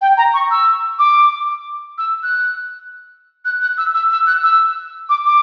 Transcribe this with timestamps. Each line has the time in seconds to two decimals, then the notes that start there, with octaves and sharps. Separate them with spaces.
0.01 G5
0.17 A#5
0.34 C#6
0.51 E6
0.99 D6
1.98 E6
2.23 F#6
3.45 F#6
3.61 F#6
3.78 E6
3.95 E6
4.11 E6
4.27 F#6
4.43 E6
5.09 D6
5.25 D6